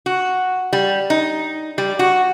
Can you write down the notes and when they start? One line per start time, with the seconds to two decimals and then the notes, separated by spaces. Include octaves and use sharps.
0.06 F#4
0.73 G3
1.10 D#4
1.78 G3
1.99 F#4